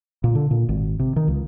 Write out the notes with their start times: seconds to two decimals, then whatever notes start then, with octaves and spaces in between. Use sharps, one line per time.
0.24 A#2
0.35 D3
0.51 A#2
0.69 G#1
0.99 C3
1.16 D#3
1.28 C#2